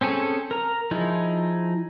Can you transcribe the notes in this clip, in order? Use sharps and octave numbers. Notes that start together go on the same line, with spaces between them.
C4 C#4 G#4 A4
A#4 A#5
F3 D#4 E4 G#4